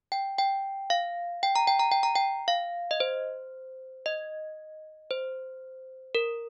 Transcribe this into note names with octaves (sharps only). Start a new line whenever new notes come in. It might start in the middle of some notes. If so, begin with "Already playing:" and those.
G5
G5
F5
G5
A#5
G5
A#5
G5
A#5
G5
F5
D#5
C5
D#5
C5
A#4